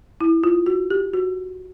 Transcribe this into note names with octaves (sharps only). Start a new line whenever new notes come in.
E4
F4
F#4
G4
F#4